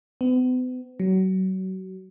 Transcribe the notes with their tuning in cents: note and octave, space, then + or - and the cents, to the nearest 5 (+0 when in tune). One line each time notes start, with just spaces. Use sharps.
B3 +40
F#3 +30